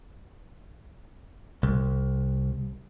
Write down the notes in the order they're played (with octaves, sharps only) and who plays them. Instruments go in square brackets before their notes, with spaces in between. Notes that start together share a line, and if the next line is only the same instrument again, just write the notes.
[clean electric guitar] C2